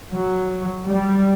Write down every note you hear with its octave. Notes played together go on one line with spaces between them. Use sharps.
F#3
G3